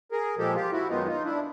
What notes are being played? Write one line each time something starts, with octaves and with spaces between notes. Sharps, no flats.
G#4 A#4
A#2 F3 G#3 G4 A4
F4 G4
E4 F#4
F#2 D#3 G#3 B3 D#4 F4
D#4 F4
D4 E4